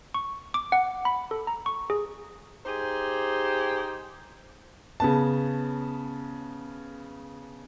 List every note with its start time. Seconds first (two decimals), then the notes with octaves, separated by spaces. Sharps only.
0.14 C#6
0.54 D6
0.72 F#5
1.05 B5
1.31 A4
1.47 A#5
1.66 C#6
1.90 G#4
2.66 D#4 G4 G#4 C5
5.00 C#3 B3 A5